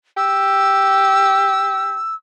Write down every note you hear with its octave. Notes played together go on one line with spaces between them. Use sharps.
G4 E6